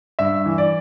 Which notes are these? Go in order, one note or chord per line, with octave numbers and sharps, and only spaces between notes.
G2 E5
E3
D5